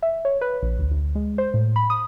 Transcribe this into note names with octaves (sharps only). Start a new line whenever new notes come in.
E5
C#5
B4
A#1
D2
D2
G#3
C5
A2
B5
D#6